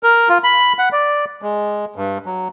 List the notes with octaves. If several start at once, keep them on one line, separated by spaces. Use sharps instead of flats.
A#4
F4
B5
F#5
D5
G#3
G2
F#3